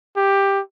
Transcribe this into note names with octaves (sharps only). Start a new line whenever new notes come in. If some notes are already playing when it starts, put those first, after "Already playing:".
G4